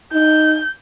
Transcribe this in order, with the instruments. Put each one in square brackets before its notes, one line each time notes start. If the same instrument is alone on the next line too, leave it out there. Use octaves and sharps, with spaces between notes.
[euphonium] D#4 [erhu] G6